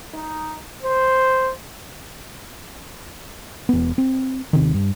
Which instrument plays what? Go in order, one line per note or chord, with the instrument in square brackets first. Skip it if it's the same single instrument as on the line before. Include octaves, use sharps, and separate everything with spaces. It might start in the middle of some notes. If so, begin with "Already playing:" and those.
[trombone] D#4
C5
[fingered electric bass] E1 B3
C4
D#1 C3 D#3
G2